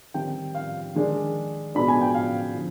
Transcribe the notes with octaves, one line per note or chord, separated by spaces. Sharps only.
D#3 G3 C4 G5
F5
D#3 G#3 D4
B2 G#3 D4 B5
G#5
G5
F5
D3 F3